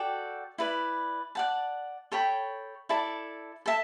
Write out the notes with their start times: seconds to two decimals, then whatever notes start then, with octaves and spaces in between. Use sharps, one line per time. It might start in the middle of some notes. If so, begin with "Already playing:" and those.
Already playing: F#4 A4 D5 G5
0.58 E4 B4 D5
1.35 D5 F#5 A5
2.12 A4 C#5 G5 B5
2.89 E4 A4 D5 A5
3.66 A4 E5 A5